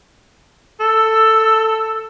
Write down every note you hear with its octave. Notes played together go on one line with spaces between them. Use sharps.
A4 E6